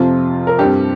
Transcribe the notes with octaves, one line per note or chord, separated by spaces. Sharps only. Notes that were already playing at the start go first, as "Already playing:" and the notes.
Already playing: F2 C3 F3 C4 F4
A#4
G2 G3 C4 G4